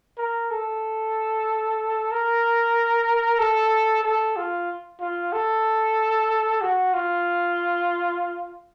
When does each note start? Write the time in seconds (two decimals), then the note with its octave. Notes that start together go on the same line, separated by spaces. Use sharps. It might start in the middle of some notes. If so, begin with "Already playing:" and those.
0.17 A#4
0.50 A4
2.11 A#4
3.39 A4
4.03 A4
4.36 F4
5.00 F4
5.32 A4
6.61 F#4
6.93 F4